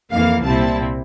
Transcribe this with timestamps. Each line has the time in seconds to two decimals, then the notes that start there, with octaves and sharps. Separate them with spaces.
0.13 F2 E3 A#3 F5
0.46 C2 A#2 G3 C4 E4 A5